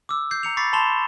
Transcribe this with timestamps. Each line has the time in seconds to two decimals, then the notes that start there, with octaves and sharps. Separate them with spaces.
0.09 D6 E6
0.31 G6 C7
0.43 A#5 C#7 F7
0.57 B5 C#6 D6 A6 B6 C7
0.73 A5 B5 C6 E7 F7 G7